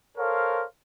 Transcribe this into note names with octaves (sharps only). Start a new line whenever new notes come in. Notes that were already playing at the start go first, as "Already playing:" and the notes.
A4 A#4 C5 C#5 F5